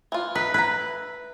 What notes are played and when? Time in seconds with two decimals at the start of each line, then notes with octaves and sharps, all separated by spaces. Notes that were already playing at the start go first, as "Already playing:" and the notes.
0.12 E3 F4
0.35 D#4 B4
0.54 E4 B4 A#5